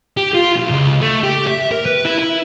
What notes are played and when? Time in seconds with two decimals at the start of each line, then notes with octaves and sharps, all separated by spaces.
0.17 G4
0.34 F4
0.56 B1
0.70 C#2
1.02 A3
1.23 G4
1.47 E5
1.71 A#4
1.86 B4
2.05 E4
2.19 E4